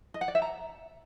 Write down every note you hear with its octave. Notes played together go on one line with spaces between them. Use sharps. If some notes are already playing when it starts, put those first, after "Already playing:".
D#5
F#5
D5
E5
A#5